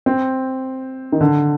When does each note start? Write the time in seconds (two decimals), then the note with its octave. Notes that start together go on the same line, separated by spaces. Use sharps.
0.06 C4
1.12 D#3
1.21 D3